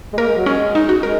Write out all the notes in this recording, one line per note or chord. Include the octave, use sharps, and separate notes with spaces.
G#3
A#3 A#4
G#3
F#3
G#3 C#4
D#4
F#4
G#3 A#4